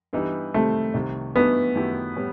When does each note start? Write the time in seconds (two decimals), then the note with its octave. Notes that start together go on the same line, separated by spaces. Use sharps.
0.13 G2 E3 G3 B3 D#4
0.54 C3 D#3 G3 A3 C4
0.94 C2 C3 D#3
1.35 G2 E3 A3 B3 D#4 F#4
1.75 F#2 D#3 A3 E4 G4
2.16 A2 G3 B3